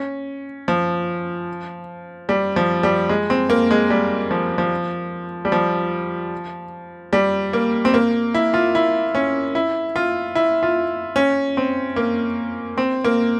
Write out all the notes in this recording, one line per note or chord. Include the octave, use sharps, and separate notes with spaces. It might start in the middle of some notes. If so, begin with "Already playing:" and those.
Already playing: C#4
F3
G3
F3
G3
G#3
C4
A#3
G#3
G3
F3
F3
G3
F3
G3
A#3
C4
A#3
E4
F4
E4
C#4
E4
F4
E4
F4
C#4
C4
A#3
C4
A#3